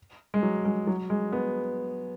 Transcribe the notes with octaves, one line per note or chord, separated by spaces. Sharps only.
G#3
F#3
G#3
F#3
G#3
B3